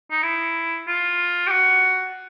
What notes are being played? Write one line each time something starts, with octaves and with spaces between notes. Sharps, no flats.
D#4
E4
F4
G4
F#4